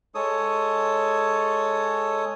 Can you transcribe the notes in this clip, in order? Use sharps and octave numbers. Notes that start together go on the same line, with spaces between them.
G#3 A4 C#5 D#6